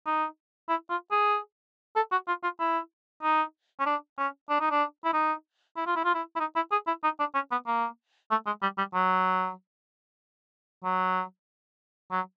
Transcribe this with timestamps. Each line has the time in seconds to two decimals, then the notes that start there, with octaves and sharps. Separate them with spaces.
0.06 D#4
0.69 E4
0.90 F4
1.12 G#4
1.96 A4
2.12 F#4
2.28 F4
2.43 F4
2.60 E4
3.23 D#4
3.80 C#4
3.86 D4
4.18 C#4
4.50 D4
4.60 D#4
4.71 D4
5.05 E4
5.13 D#4
5.77 E4
5.86 F4
5.96 E4
6.05 F4
6.14 E4
6.36 E4
6.40 D#4
6.56 E4
6.72 G#4
6.87 E4
7.04 D#4
7.20 D4
7.35 C#4
7.51 B3
7.67 A#3
8.31 A3
8.46 G#3
8.62 G3
8.78 G3
8.94 F#3
10.84 F#3
12.11 F#3